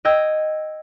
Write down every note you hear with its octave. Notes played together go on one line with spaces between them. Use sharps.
D#5 G5 E6 G#6